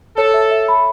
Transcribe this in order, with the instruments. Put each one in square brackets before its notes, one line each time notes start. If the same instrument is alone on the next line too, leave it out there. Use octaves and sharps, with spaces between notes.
[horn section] A4 [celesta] C#5
[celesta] E5
E5
B5